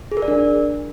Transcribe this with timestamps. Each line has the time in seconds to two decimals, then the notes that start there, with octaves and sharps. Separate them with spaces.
0.12 G#4
0.17 A#4
0.22 D5
0.28 D4